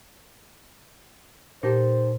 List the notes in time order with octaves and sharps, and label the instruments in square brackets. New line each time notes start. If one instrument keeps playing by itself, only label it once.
[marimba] A#2 A#6 [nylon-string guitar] D#4 G4 A4 [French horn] C5